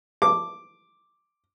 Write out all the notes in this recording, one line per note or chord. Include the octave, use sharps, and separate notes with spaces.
D6